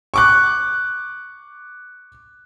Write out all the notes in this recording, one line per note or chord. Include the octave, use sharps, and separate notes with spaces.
C#6 D6 F#6